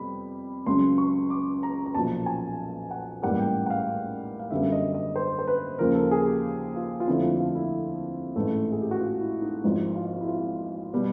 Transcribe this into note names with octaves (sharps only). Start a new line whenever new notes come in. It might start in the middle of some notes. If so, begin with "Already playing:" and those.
Already playing: F2 C3 G3 B3 B5
C#2 C#3 F#3 C6
C#6
D6
A#5
A#5
B1 A#2 F3 A5
G#5
F#5
A1 G#2 E3 G3 A#3 F#5
G5
F#5
F5
F5
F#2 D3 G3 B3 E5
D#5
D#5
C5
C5
B4
D#2 C#3 F3 A#3 A#4
A4
G#4
G4
F4
F4
F2 D3 F3 A3 E4
F4
F4
E4
A1 G#2 E3 A3
G#4
G4
F#4
F4
E4
D#4
G#1 G#2 F3 E4
F4
E4
F4
B2 G3 B3